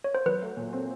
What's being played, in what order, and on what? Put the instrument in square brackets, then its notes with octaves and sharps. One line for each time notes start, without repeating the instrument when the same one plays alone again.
[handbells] C#5
C5
[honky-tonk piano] F#3 [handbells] B4
[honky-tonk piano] A3
A#2
C4